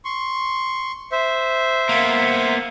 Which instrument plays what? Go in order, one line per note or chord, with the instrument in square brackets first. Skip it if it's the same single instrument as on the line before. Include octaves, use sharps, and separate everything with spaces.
[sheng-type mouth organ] C6 C#6
C5 E5
[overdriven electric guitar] A#3 B3